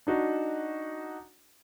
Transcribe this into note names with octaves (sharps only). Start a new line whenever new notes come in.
D4 D#4 F#4